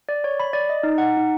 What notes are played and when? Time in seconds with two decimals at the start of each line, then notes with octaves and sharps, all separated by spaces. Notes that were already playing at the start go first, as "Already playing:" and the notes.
0.09 D5
0.24 C#5
0.40 B5
0.53 D5
0.69 D#5
0.83 D#4
0.98 F#5
1.17 D#4